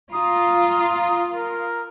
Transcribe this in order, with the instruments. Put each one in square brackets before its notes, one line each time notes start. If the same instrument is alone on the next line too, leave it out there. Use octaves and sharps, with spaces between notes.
[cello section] F4 [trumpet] A#5 [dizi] D#6
[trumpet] A#4